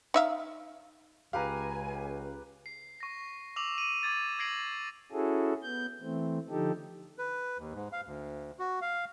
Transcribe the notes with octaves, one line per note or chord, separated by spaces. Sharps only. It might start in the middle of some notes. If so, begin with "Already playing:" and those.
D#4 E5 F5
C#2 G4 B4 F5 G#5 A#5
C7
C#6 A#6
D6 E6 F7 F#7
D#7
D6 G#6 A6
D6 G#6 A#6 C7 D7 F#7
C#4 E4 F#4 G#4 A4
B3 G6
E3 A3 C4
D3 F3 D#4 G4 A4
B4
D#2
G#2
F5
D2
F#4
F5